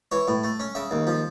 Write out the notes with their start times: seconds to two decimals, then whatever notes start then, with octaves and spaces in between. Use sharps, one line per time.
0.12 E3 C#5
0.28 A2
0.44 A3
0.60 C#4
0.75 C#3 E5
0.91 D#2
1.07 F3